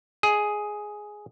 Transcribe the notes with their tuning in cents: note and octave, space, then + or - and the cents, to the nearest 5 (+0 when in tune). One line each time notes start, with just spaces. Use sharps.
G#4 +5 D#5 +0